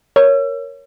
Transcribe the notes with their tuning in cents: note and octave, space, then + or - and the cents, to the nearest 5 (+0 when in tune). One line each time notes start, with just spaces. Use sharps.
A#4 +0 C#5 +0 E6 +40